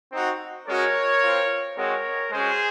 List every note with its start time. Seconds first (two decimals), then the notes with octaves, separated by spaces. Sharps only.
0.12 C4 D#4 F#4
0.68 G#3 C#4 F#4 A#4 C#5
1.22 C4 F4
1.77 G#3 C4 F#4 A#4 C#5
2.32 G#3 C#4 F#4 G#4 C5